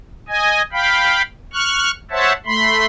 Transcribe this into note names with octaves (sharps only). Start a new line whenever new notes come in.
D#5 G#5
F5 G5 B5
C#6 F6 F#6
C5 C#5 E5 F#5 A5
A3 B5 C6